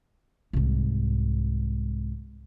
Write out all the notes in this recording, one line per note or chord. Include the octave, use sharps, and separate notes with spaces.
C2 G#2